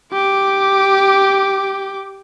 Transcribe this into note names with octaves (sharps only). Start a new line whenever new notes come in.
G4 D6